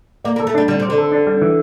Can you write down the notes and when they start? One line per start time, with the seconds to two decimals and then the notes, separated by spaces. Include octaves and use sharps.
0.24 A#3 D5
0.36 A#3
0.39 A4
0.47 A3
0.55 G3 D4
0.68 D3 G3
0.80 C3 D5
0.90 D3
0.98 A4
1.12 D4
1.27 G3
1.42 E3